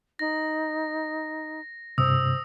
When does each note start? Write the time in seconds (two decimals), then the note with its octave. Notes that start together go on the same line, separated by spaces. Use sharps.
0.19 D#4 A#6
1.98 G2 C3 C5 D#6 E6